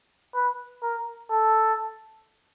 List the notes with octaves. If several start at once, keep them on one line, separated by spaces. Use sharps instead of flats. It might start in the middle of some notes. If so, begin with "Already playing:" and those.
B4
A#4
A4